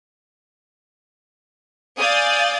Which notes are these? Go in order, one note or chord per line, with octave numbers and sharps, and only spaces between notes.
D5 F5 G#5 D#6 G6 A6